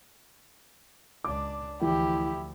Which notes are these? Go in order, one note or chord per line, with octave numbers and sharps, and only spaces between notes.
C#2 D4 D6
D2 E3 F3 E4 G4